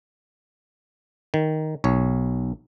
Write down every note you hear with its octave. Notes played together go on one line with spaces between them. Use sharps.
D#3
B1 C#5